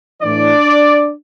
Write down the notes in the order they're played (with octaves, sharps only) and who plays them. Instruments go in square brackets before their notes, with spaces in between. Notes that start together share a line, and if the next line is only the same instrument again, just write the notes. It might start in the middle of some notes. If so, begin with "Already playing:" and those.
[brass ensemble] A2 E3 D4 D5